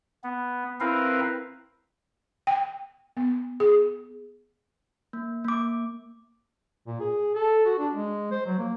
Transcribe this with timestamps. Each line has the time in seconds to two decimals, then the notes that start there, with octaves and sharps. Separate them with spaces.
0.24 B3
0.80 C4 E4 A#4 B4 F5
2.47 G5
3.17 B3
3.60 G#4
5.13 A#3
5.44 A#3 D6
6.87 A#2
7.00 G#4
7.35 A4
7.65 F#4
7.78 D4
7.93 G#3
8.31 C5
8.46 F#3
8.58 A#3